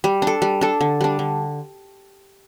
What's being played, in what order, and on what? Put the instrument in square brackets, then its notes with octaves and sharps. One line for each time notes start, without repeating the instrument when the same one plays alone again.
[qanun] G3
D4 A4
G3
D4 A4
D3
G3 D4
D3